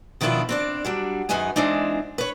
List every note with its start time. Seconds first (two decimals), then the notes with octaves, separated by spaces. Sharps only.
0.21 B2 D#3 F3 D4 E4 F4
0.49 C4 D4 D5
0.85 F#3 G3 D4
1.29 F#2 D#3 G#3 B4 D#5 G#5
1.56 E3 G#3 C4 D4 D#4
2.18 B4 C#5